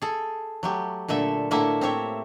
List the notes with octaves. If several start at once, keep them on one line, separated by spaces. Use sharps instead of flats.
G#4 A4
F#3 A3 G4
A#2 D3 A3 E5
A2 D3 A3 A#3 E4 E5
C4 G4 C#5 E5